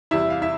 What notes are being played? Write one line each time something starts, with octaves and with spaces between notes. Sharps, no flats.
E2 C3 G3 E4 E5
F5
E4 E5